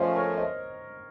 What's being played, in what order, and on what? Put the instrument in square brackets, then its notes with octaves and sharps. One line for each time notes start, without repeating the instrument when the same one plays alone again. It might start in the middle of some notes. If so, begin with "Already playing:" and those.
Already playing: [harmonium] F3 A3 C#4 F4 [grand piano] A#4 C5 C#5 D#5
[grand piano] A#4 C#5
C5 D#5